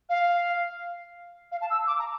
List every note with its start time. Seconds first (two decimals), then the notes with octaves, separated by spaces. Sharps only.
0.09 F5
1.52 F5
1.61 A5
1.70 E6
1.87 D6
1.99 A#5